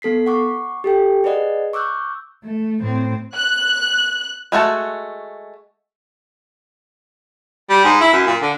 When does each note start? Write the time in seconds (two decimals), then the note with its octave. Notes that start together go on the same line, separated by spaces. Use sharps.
0.02 B3 A4 B6 C7
0.27 F#5 C#6 D6
0.84 G4 A4 G5
1.24 G#4 B4 D5 D#5 F#5
1.73 C#6 D6 E6 F#6 G6
2.44 A3
2.80 A2 C4
3.35 F#6
4.52 G#3 A3 F#4 A5
7.70 G3
7.84 G#2
8.01 E4
8.13 F#2
8.27 A#2
8.42 D3